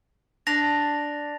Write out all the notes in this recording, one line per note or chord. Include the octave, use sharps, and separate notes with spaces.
D4 A#6 F7